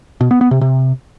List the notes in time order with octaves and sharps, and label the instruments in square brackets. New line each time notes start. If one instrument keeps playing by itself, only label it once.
[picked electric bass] B2
B3
B3
C3
C3